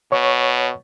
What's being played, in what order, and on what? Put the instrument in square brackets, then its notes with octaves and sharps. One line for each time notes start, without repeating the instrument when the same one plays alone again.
[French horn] B2 [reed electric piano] C#5 C#6